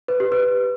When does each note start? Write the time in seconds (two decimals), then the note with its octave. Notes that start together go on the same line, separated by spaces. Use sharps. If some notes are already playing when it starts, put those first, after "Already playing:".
0.08 B4
0.20 G4
0.32 B4